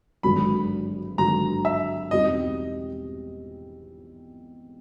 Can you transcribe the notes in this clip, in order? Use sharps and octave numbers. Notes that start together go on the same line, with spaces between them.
G#1 G2 D3 F#3 B5
G#1 G2 D3 F#3 A#5
E5
E2 B2 G3 C4 D#4 D#5